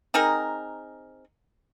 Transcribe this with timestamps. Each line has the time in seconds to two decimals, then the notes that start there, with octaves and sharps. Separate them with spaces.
0.14 C4 D#4 G#4 A#4